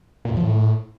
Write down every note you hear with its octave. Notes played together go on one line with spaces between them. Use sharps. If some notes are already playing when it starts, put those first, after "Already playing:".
A#2
E2
F3
A2